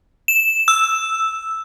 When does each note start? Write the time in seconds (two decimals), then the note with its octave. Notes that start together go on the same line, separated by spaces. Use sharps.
0.28 E7
0.68 E6